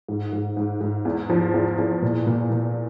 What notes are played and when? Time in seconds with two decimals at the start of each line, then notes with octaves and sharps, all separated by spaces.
0.08 G#2
0.33 G#2
0.57 G#2
0.81 G#2
1.05 E2
1.30 F3
1.54 E2
1.78 E2
2.02 A#2
2.26 A#2
2.50 A#2